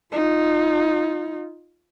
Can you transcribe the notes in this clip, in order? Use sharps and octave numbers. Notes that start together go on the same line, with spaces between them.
D#4 F4